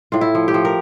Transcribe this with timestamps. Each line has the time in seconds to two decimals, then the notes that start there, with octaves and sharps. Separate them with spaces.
0.12 A2 F4
0.21 E4
0.35 F3
0.48 G4
0.54 F3
0.65 A#4